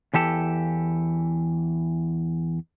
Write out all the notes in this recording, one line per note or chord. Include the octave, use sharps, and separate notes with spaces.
E2 E3 G4 A4